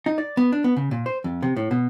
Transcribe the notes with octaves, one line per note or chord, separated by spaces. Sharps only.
D#4
D5
B3
D4
B3
C#3
A#2
C5
F2
C3
A2
B2